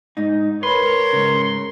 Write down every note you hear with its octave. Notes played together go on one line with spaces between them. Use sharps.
G#2 D#4
A#4 B4 C#5 C6
G#2 C#3